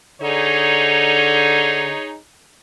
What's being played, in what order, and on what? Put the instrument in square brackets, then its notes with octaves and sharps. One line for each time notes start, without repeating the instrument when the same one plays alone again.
[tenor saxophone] D3 [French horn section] D#4 G#4 C#5